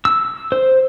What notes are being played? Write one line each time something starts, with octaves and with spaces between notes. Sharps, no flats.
E6
C5